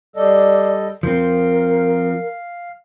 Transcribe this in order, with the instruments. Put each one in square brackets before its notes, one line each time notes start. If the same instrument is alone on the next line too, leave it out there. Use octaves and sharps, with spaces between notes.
[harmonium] G3 A4 D#5 [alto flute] D5
[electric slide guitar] F3 C4 [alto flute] A#4 [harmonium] F5